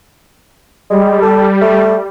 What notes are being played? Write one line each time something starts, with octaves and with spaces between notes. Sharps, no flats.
G3 G#3
A4
A3